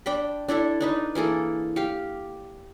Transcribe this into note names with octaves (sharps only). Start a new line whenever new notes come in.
D4 G5 B5
D4 E4 A4 E5
D4 D#4 B4
E3 A#3 G#4 A4
G4 F5